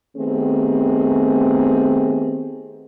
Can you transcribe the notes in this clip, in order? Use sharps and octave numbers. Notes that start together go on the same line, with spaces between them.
D#3 A3 B3 C4 G4 G#4